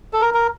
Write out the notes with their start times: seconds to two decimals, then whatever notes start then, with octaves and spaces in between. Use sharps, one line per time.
0.13 A4
0.21 A#4
0.34 A#4